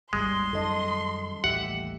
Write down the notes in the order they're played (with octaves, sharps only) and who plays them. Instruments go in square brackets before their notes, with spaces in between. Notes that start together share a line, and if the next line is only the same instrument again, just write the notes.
[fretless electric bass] G#1 D#2 G#2 [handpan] G3 [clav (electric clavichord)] G#3 [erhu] C6
[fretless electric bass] F#2 D#3 [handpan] A4 D#5
[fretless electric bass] A1 D#2 [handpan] G4 E5 [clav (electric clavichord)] F#5